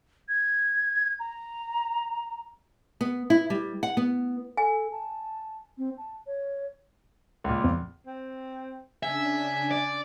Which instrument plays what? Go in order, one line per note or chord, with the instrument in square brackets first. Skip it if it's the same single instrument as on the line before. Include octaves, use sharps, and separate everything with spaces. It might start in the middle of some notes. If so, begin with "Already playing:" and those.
[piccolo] G#6
A#5
[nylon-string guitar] B3
E4
G3
F#5
B3
[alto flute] A4 [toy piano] G#5
[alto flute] A5
C4
A5
C#5
[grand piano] C#2 A#2
[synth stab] F2
[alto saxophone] C4
[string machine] C#3 D4 [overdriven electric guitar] E5 [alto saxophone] G#5
[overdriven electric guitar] D5